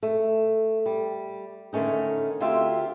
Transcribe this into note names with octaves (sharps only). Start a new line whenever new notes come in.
A3
G3
D3 D#3 A3 C#4 D#4
D2 C4 F4 G4 E5 F5